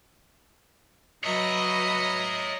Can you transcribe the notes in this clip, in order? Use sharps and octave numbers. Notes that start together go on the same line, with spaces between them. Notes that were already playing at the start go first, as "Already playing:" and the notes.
F#3 B4 C#5 D#5 E5 A#5